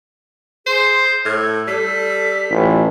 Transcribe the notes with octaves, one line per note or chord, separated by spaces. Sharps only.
G#4 C5 C6
A2 A4 G#6
G3 B6
A1 F4